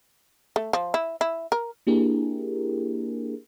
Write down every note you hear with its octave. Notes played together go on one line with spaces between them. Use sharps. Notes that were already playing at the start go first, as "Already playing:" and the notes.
A3
F3
E4
E4
A#4
A#3 D4 E4 G4 G#4 A#4